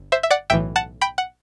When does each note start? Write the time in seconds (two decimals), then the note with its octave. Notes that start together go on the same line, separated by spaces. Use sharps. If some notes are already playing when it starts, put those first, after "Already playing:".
Already playing: G1
0.12 C5 E5
0.23 E5
0.31 D5 F#5
0.50 B1 A2 E3 E5 G5
0.76 F#5 A5
1.01 G5 B5
1.18 F#5